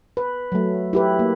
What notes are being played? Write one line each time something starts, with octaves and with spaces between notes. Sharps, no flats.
B4
F#3 A3
E4 G4 B4
A#3